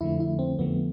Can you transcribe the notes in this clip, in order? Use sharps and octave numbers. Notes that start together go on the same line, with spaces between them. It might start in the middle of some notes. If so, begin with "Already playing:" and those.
F2 D3 F3 A3 E4
E4
C4
F2 D3 F3 A3 B3